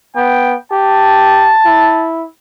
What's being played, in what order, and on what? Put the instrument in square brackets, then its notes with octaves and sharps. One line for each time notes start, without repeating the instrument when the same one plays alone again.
[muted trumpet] B3 [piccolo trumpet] G5
[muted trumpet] G4 [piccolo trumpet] A5
[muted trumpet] E4